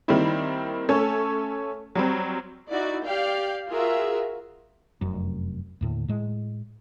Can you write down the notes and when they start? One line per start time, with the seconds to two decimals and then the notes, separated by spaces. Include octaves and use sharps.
0.08 D#3 G3 A#3 C4 E4
0.89 A3 C#4 A4 C#5
1.95 F#3 G3 C4
2.71 D#4 E4 F#4 D5
3.05 G4 D5 F5 G5
3.68 F4 F#4 G#4 A#4 E5
5.01 F1 F#2
5.81 D#2 A2 D3
6.08 A2 G#3